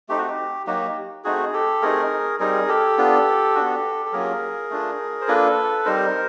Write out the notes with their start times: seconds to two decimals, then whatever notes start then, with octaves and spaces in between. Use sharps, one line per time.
0.09 A3 C4 D#4 G4
0.18 F#4
0.27 G4
0.66 F#3 A#3 D#4 F#4 G4
1.24 A3 C4 D#4 F#4 G#4
1.53 G4 A4
1.82 A3 C4 D#4 G#4 A#4
2.40 G3 C4 D#4 G#4 A#4
2.68 G4 A4
2.98 B3 D4 F4
3.55 B3 D4 F#4
4.05 A4
4.13 F#3 A#3 C#4 F4 G#4 A#4
4.70 A3 D4 F4
5.21 C5
5.28 A#3 D4 F4 A4 B4
5.85 G3 C4 D#4 A#4 C5